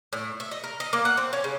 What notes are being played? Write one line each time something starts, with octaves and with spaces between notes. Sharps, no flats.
A2
E5
D#5
A#4
D#5
A#3
F#5
C4
C#4
C#3